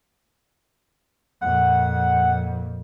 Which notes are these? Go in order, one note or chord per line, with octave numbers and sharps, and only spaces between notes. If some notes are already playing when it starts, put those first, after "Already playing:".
F2 A#2 F#5